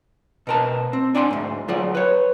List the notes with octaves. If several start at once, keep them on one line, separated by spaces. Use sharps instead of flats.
B2 A#4 A5
C4
D4 D5 G#5 A#5 C6
D2 G#2
F#3 F4 G#4 D5
B4 C#5